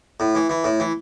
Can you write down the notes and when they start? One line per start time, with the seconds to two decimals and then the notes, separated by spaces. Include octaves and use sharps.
0.20 A2
0.35 E3
0.49 E3
0.64 A2
0.80 E3